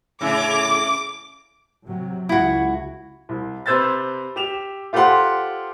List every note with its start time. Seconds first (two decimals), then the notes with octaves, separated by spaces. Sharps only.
0.21 A2 C#3 D6
1.87 C3 F#3
2.29 C#2 E4 F#4
3.29 C2
3.66 C3 B4 C5 E6 G#6 A6
4.36 G4 E7 F7
4.93 F4 G4 A4 C5 F#5 C6